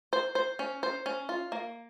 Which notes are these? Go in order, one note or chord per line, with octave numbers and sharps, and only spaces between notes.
C5
C5
C#4
C5
C#4
F4
A#3